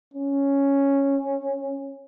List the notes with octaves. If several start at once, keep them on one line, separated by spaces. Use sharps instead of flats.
C#4